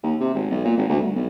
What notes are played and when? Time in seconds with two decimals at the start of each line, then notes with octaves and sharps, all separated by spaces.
0.03 D#2
0.21 C3
0.35 G#1
0.51 B1
0.65 A#2
0.77 G#1
0.89 D2
1.01 G1
1.16 B1